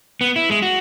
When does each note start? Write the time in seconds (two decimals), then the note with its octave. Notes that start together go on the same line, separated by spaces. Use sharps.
0.21 B3
0.36 E4
0.50 G#3
0.62 F#4